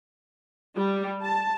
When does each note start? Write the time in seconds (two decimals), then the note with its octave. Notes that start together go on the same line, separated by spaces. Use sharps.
0.76 G3
1.22 A5